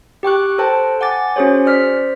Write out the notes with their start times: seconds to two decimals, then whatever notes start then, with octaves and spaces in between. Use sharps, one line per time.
0.23 G4 G5 C#6 F#6
0.58 A4 C5 G5 A5
1.01 F#5 G#5 D6 A6
1.36 C#4 F#4 G#4 C5 C#5
1.66 C5 D5 F6 B6